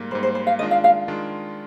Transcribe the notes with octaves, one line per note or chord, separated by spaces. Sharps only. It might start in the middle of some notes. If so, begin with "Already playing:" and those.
Already playing: G#2 G3 A#3
G#2 G3 A#3 C5
C5
C5
F5
D#3 G#3 D4 F4 D#5
F5
F5
D#3 G#3 D4 F4